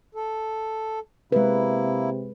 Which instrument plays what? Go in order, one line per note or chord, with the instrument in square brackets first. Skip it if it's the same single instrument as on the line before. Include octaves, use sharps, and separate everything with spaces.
[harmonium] A4
[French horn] C3 [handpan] G#3 B4 [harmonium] A#3 E4